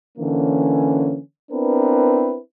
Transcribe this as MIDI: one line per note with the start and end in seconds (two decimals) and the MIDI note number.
0.18 1.19 50
0.18 1.19 52
0.18 1.19 58
0.18 1.19 61
1.52 2.38 59
1.52 2.38 60
1.52 2.38 62
1.52 2.38 64
1.52 2.38 70
1.52 2.38 71